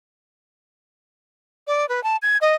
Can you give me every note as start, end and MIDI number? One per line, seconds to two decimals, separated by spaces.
1.67 1.88 74
1.89 2.03 71
2.04 2.17 81
2.22 2.37 92
2.41 2.54 75